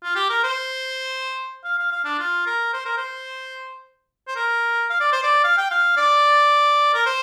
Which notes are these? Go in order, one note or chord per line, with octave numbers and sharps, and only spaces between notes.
F4
G4
A#4
C5
F5
F5
F5
D4
F4
A#4
C5
A#4
C5
C5
A#4
F5
D5
C5
D5
F5
G5
F5
D5
A#4
C5